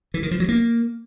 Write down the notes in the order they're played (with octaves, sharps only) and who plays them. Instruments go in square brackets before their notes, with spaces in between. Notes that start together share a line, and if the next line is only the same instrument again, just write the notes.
[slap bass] E3
D#3
F3
F#3
A#3